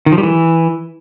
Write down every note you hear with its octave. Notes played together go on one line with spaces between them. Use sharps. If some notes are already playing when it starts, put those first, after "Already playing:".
D#3
F3
G3
E3